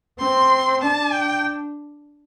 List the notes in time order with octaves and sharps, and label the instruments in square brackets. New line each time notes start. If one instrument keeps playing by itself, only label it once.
[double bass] C4 [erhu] C6
[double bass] D4 [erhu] A5
[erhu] G5